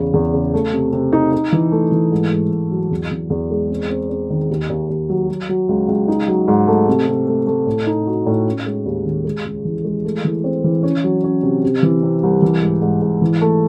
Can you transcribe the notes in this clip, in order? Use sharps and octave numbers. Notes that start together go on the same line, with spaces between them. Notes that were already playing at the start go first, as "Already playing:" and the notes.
Already playing: E2 C#3
E2
C#3
A3
C3
C3
D#4
D#4
E3
A3
E3
G#2
G#2
G#2
F#3
E2
E2
E2
G#3
C4
C4
C4
D#3
D#2
D#2
D#2
F#3
F#3
F#3
C#2
C#2
D#4
F#3
G#2
A3
C3
C3
A3
A3
A2
D#4
F#4
A2
C#4
G#3
D#2
D#3
G#3
C#2
E3
G#3
A3
E3
C4
E3
C#4
F#3
C#4
C3
C3
E3
C3
C2
E3
G#2
G#2
G#2
E3
A3